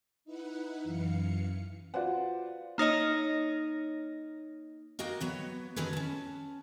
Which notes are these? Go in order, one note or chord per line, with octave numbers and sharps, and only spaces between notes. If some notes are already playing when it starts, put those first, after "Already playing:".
D#4 E4 B4 F#5
F#2 E3 F5 C#7
F4 F#4 B4 C5 D5 F#5
A#3 D#4 C#5 D#5
A#3 F#4 D#5 F5 G5
F#3 B3 C#5
D#3 F3 F#3 C#4 G#4 B4
C#4 A5